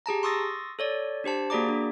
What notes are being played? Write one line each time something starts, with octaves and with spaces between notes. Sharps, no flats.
G4 G#4 A5 A#5
C6 C#6 D#6 E6 A6 A#6
A4 C#5 D5
D4 G4 C5 A5
A#3 F#4 G#4 D5 A#5 D6
D4